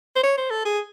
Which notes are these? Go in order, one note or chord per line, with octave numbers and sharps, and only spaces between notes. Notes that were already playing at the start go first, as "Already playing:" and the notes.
C5
C#5
C5
A4
G#4